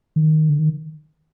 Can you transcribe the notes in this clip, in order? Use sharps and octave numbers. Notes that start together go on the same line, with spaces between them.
D#3
D3
D#3